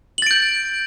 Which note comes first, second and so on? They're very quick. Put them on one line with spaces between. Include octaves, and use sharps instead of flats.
F#7 A6 D7 G6